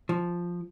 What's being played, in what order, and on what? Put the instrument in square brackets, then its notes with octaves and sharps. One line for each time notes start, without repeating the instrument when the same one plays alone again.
[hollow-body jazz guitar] F3